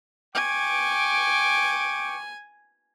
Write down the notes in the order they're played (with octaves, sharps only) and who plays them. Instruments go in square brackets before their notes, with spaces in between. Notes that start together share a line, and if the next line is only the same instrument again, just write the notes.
[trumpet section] G5 C#6 D6 [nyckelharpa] G#5